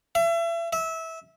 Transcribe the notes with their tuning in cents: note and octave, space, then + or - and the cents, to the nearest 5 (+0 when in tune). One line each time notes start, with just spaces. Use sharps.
E5 +35
E5 -20